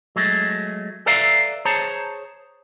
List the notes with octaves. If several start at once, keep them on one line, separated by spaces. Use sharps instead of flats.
F#3 G#3 A3
A4 B4 D5 E5 F5 A#5
G#4 C5 C#5 A5 A#5